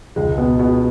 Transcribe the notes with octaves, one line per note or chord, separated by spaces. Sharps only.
C#2 G#3
B2 B3
B2 B3